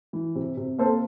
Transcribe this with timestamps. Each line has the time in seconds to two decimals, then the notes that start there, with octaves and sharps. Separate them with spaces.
0.13 E3
0.35 C3
0.57 C3
0.79 A#3 A4 C5